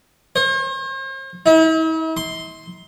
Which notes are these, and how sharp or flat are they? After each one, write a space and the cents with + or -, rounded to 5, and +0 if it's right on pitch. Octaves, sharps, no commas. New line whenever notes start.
C5 +45
E4 -45
C6 +5